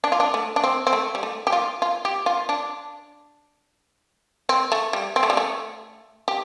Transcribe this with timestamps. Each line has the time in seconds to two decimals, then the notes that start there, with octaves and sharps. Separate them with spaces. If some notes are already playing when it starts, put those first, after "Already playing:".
0.04 D4
0.12 F4
0.20 D4
0.34 A3
0.56 D4
0.64 C4
0.87 C4
0.93 A3
1.15 G3
1.23 A3
1.47 G4
1.52 F4
1.82 F4
2.05 G4
2.26 F4
2.49 D4
4.49 C4
4.72 A3
4.93 G3
5.16 C4
5.23 A3
5.30 G3
5.37 A3
6.28 G4